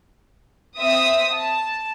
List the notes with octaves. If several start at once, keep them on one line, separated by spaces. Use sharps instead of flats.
C4 E5 D#6
A5